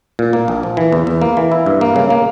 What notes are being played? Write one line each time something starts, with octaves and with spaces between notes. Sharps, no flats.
A#2
A#3
A#1
F3
E3
E2
E2
A#3
E3
E4
G2
A#3
C#3
A#3